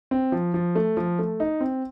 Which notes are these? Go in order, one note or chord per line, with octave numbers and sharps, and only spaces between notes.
C4
F3
F3
A3
F3
A3
D#4
C4